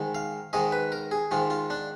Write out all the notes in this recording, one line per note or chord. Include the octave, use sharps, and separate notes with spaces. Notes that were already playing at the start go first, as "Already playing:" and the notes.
Already playing: G#2 D#3 G#3
F5
G#2 D#3 G#3 D#5
B4
A#4
G#4
G#2 D#3 G#3 F4
F4
D4